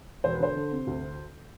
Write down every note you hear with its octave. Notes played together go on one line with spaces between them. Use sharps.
E1 C5
B4
D3 C5
D3
C3
D2